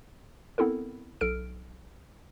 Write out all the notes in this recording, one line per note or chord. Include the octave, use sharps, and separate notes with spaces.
B3 C4 E4 A4 A#4
B1 A4 F6 D7